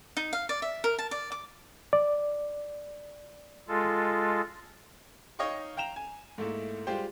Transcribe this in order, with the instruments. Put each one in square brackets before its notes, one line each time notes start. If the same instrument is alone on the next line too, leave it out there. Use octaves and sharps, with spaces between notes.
[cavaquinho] D#4
F5
D5
E5
A#4
A5
D5
D6
[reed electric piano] D5
[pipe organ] G#3 F4 A4
[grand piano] D#4 C#5 D#5 F5 G5 C#6
F5 G5 A#5 E7 F7
G#5
G#2 A3 A#3 E4
G3 G#3 F4 G4 C5 G5